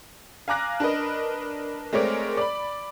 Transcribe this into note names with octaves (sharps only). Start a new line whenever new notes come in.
F5 G#5 A#5 D6 F#6 A#6
D4 A#4 B4 D#5
G#3 A3 C4 A#4 C#5 D5
D5 B5